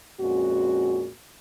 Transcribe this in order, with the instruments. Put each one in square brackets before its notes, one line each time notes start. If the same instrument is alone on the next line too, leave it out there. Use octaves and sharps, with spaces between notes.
[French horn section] F2 A#2 G#3 C#4 F#4